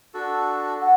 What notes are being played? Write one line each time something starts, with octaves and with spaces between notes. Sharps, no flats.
D4 F#4 A4
F#5